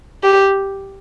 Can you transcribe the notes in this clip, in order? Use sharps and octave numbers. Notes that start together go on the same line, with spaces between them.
G4